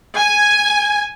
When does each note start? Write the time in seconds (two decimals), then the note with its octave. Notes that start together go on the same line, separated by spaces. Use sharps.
0.17 G#5